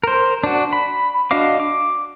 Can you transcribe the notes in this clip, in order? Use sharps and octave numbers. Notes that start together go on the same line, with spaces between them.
A#4 C5
D4 F#4
B5
D4 F#4 D#5 F5 D6
D6